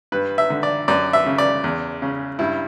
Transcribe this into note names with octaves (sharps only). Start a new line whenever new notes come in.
G2 B4
E5
D3
D5
F#2 D5
E5
C#3
D5
E2
C#3
G2 E4